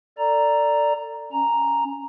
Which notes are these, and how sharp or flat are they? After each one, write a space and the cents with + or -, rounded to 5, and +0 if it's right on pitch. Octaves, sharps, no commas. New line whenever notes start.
A4 +30 D5 +0 A#5 +0
C#4 +0 A#5 +0